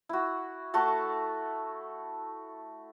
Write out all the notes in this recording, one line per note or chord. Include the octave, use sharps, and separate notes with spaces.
E4 F#4
A3 F#4 A4 A5